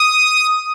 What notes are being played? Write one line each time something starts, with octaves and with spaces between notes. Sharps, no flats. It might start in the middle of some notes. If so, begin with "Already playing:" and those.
Already playing: D#6